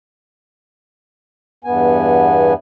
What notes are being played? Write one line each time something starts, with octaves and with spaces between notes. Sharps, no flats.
E2 G2 B3 G#5